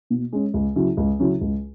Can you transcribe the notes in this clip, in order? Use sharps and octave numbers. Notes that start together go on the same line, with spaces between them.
B2
G#3 C#4
C#2
C#3 F#3 C#4 E4
C#2
C#3 F#3 C#4 E4
C#2